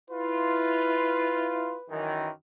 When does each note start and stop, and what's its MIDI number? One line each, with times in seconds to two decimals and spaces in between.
0.11 1.76 64
0.11 1.76 65
0.11 1.93 71
1.90 2.29 42
1.90 2.29 51
1.90 2.29 52